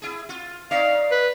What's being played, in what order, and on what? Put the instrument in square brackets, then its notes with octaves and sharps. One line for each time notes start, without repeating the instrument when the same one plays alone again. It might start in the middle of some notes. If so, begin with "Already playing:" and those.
[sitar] E4 G#4
F4
[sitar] D#4 C#5 D5 [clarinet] F5
[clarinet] B4